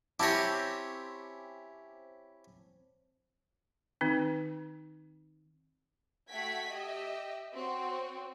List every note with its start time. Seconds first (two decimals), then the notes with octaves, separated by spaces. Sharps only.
0.20 C4 C#4 E4 G4 C#5 A5 D6
4.01 D#3 C4 D#4
6.30 A3 F#4 F#5 G5 G#6 B6
6.69 G4 D#5 E5
7.52 C4 F#4 C#5